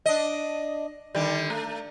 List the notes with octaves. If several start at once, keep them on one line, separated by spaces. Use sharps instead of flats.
D4 D#5
D3 D#3 G3
A3